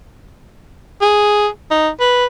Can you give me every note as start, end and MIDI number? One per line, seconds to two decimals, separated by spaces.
1.01 1.48 68
1.71 1.89 63
2.00 2.25 71